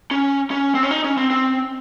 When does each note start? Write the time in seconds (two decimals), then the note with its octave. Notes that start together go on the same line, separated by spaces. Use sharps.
0.11 C#4
0.51 C#4
0.75 C4
0.83 C#4
0.91 D#4
1.04 C#4
1.17 C4
1.30 C4